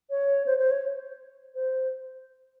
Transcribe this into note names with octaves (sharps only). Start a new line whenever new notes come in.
C#5
C5
C5
C#5
C5